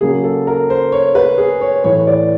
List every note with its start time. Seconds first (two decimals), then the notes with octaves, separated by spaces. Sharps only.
0.01 C#3 F#3 A#3 G#4
0.24 A4
0.47 A#4
0.70 C5
0.92 C#5
1.15 B4
1.38 G#4
1.61 C#5
1.84 A2 E3 A3 C#5
2.07 D5